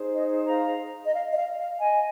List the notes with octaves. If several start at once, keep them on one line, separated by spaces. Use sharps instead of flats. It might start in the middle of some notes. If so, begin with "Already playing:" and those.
Already playing: D#4 G#4 C5
D#5
F5 A#5
D#5
F5
D#5
F5
F5
D#5 G#5